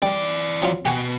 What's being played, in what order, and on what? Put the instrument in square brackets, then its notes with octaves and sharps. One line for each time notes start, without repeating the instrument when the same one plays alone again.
[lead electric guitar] E3 D5 [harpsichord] G3
[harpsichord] F3 F#3 F4
[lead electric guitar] B2 [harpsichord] G4 F#5 G#5